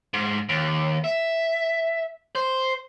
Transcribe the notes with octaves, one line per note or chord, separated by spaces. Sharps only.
G#2
D#2
E5
C5